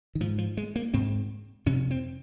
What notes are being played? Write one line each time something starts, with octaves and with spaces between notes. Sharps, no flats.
D#3
G#2 F3
F3
G#3
A#3
G#2 C4
F2 C3 C#4
C4